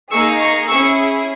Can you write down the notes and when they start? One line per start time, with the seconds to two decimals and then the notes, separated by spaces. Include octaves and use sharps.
0.11 A#3 D#4 G#4 C#6 E6
0.40 A#5 C#6
0.67 C#4 E4 G#4 C#6 E6